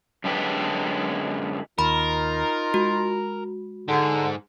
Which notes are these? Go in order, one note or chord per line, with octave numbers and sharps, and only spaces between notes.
F#2 D3 G#3 G4 B4
D#2 D#4 F4 A#4 B5
G#3 F#4
G#2 D3